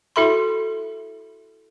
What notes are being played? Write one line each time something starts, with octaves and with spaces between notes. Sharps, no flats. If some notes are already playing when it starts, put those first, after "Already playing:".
E4 F#4 A4 E5 B5 C6